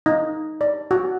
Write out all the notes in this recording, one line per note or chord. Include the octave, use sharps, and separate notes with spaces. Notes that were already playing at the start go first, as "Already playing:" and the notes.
D#4
D5
F#4